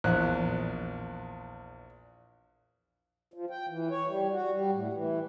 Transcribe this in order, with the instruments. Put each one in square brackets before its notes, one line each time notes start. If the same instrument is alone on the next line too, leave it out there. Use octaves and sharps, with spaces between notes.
[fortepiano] A#1 E2 F#6
[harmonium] F3
G5
E3
C#5
G3
F#4
G3
A2
E3